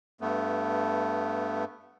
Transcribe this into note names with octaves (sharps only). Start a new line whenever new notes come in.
G2 A3 B3